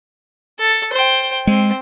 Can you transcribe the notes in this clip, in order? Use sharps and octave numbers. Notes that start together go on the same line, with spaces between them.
A4
C5 G5
G#3 C4